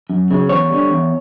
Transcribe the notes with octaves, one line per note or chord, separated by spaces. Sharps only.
F#2
C#3 F#3
E2 C#5
D3 G3
E2